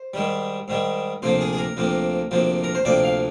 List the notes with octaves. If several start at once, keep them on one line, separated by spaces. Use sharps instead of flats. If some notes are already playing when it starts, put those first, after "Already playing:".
Already playing: C5
G#2 D#3 G3
G#2 D#3 G3
D2 C3 F3 A#3 C5
G#4
G#4
A#4
D2 C3 F3 A#3
D2 C3 F3 A#3
A#4
C5
D2 C3 F3 A#3 D5
F5